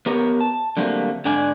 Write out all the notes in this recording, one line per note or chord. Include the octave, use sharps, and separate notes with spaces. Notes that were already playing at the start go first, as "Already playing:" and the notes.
B3 G4 A#4 C#5
A5
D3 F#3 G3 A3 A#3 C4
G#2 D3 D4 D5 G#5